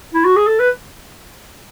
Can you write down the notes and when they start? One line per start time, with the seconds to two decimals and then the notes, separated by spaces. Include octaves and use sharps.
0.14 E4
0.25 F#4
0.36 G#4
0.47 A4
0.59 B4